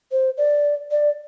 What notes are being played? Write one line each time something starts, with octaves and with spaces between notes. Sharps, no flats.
C5
D5
D5